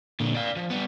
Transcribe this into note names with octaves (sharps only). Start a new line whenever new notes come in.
A#2 D3
D5 F5
F3
G3 B3